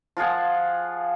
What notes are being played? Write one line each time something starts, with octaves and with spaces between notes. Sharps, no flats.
F3 F4 G#4 F#5